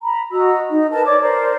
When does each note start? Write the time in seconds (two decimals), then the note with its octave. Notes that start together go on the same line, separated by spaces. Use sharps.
0.02 A#5 B5
0.31 F#4 D#5 A#5 E6
0.70 D#4
0.91 A#4 B4 A5
1.05 C#5 D5 D6
1.21 A#4 C5 D5